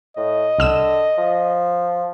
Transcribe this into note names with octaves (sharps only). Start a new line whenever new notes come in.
A2 D#5
C2 D3 E6 E7
F3